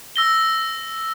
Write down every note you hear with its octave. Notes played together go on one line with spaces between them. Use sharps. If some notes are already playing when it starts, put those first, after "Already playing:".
E6 A#6 G7